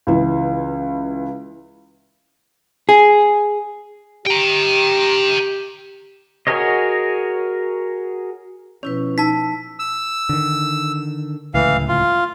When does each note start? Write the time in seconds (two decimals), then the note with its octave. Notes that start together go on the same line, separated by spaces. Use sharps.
0.07 C#2 E3
2.89 G#4
4.26 G4 G5 A#5
6.47 F#4 G#4 A#4 C#5 D#5
8.83 B2 F3 C#4 E4 B4 C#5
9.18 D#4 A5 E6 B6
9.79 E6
10.29 D3 D#3
11.54 D1 C#2 A2 E3 F5
11.89 F4